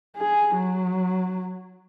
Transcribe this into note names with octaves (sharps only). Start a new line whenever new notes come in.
G#4
F#3